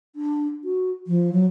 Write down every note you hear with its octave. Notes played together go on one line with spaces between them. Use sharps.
D4
F#4
F3
F#3